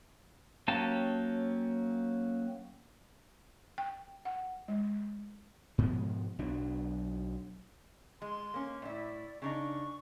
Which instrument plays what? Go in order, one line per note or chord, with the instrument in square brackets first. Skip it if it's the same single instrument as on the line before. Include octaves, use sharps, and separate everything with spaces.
[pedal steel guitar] F#3 A#3 C#4 G4 A5
[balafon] G5
F#5
G#3
[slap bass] G#2 B2 F3 G#3
B1 B2 F#3 D4
[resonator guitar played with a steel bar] G#3 [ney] C6
[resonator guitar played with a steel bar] A#3 C#4
[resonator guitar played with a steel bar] A2 E4 [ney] D5
[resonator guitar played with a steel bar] C#3 D4 D#4 [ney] C#6